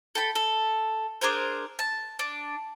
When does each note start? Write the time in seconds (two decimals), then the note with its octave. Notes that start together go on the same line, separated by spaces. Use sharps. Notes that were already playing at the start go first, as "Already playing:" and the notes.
0.15 A4 G5 B5
0.35 A4
1.21 D4 G#4 A#4 C5
1.79 A5
2.19 D4